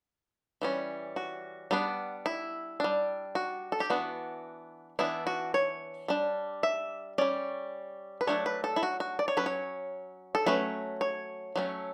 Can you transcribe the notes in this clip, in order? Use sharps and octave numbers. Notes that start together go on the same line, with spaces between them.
E3 G3 C#4
F#4
G3 B3 D4
E4
G3 D4
F#4
A4
G4
E3 B3 D4 F#4
E3 B3 D4 E4
F#4
C#5
G3 D4
E5
G3 C#4 D5
B4
F#3 A3 D4 C#5
B4
A4
E4
F#4
F#4
D5
C#5
F#3 C#4 B4
C#5
A4
F#3 A3 C#4 B4
C#5
F#3 A3 C#4